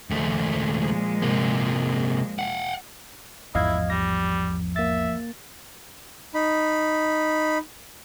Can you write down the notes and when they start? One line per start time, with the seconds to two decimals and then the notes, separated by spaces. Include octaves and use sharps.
0.11 D#2 A#2 F3 G#3 A3
1.22 C3 A#3
2.39 F5 F#5
3.55 A1 E2 G#2 F3 E4 D#5 F5 G#6
3.90 G3 A#6
4.76 A#3 E5 A6
6.34 D#4 B5